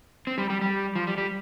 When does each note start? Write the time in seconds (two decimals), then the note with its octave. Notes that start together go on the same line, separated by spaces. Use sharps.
0.27 C4
0.38 G3
0.50 G3
0.62 G3
0.95 F3
1.07 G3
1.18 G3